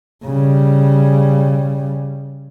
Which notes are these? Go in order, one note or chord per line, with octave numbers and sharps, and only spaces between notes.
C#3 G3